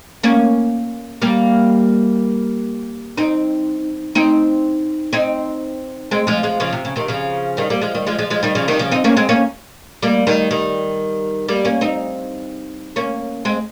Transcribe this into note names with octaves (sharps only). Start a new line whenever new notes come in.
A#3 C#4
G3 A#3
C4 D#4
C4 D#4
C4 D#4
G#3 C4
F3 G#3
F3 G#3
C#3 F3
C3
C#3
C3 D#3
C#3 F3
D#3 G3
G3 A#3
F3 G#3
D#3 G3
F3 G#3
F3 G#3
F3 G#3
D#3 G3
C#3 F3
C3 D#3
C#3 F3
C4 D#4
A#3 C#4
G#3 C4
A#3 C#4
G3 A#3
D#3 G3
D#3 G3
G3 A#3
A#3 C#4
C4 D#4
A#3 C#4
G#3 C4